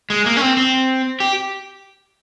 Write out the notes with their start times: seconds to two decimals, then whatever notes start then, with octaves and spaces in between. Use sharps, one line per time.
0.10 G#3
0.26 A#3
0.37 C#4
0.41 C4
0.57 C4
1.20 G4